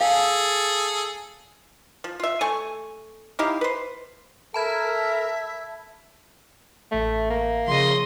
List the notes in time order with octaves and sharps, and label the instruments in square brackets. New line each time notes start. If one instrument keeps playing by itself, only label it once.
[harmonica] G#4 A4 [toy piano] F5
[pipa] F3
F4 E5
A3 G#5 C#6
D#4 E4 G4 F5
B4 C5
[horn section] A4 A#4 [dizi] E5 [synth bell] A5 B5 G#6
[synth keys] A1 E5 [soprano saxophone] A3
[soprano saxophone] A#3
[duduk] C#3 [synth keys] F3 [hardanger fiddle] D#5 C6